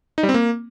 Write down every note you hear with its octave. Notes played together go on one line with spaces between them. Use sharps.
D#4
G3
C4
A#3